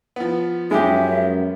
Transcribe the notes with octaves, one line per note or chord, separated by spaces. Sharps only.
F3 B3
F#2 G#3 C#4 G4 E5